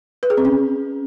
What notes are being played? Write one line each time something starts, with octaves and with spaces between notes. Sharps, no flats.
B4
G#4
C4
C#4